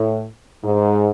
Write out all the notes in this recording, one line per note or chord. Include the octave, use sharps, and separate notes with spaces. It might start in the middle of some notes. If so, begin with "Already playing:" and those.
Already playing: A2
G#2